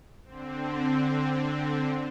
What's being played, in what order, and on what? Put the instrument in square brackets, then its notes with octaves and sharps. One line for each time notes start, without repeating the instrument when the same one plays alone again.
[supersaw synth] D3 C4